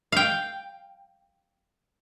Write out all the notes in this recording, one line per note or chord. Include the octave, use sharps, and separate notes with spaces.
F5 G5